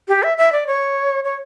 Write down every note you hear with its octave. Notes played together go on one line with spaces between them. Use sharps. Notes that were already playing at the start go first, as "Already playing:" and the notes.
G4
E5
E5
D5
C#5
C#5